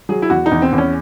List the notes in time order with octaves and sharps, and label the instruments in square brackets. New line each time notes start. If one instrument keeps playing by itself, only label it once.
[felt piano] F#3 G#4
E4
E2 F#4
D#4
E2
C4
E2
C#4